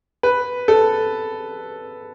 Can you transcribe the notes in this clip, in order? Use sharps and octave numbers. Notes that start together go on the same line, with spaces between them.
B4
A4